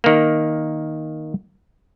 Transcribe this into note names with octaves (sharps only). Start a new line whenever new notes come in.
D#3 A#3